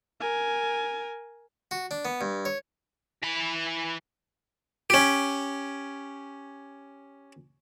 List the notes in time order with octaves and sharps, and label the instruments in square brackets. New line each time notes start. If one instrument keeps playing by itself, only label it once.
[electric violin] A#4 G#5
[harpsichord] F#4
D4
B3
G2
C#5
[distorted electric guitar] E3 B5
[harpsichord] C#4 G4